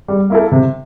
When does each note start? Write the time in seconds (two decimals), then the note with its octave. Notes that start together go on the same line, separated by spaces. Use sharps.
0.08 G3
0.30 A#3 E4 A4
0.52 C3